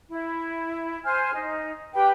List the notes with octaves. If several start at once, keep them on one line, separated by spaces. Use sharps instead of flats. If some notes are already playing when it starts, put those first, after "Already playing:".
E4
C5 G#5 F6
D#4
G4 B4 G5